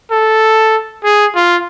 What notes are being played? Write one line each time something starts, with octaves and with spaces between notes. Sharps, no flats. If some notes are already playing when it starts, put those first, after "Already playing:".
A4
G#4
F4